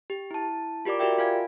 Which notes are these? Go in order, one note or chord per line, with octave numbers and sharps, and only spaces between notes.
G4
E4 A5
F4 G4 A#4 D5 D6
F#4 G4 A#4 D5 E5 G5
F4 F5 G#5 G#6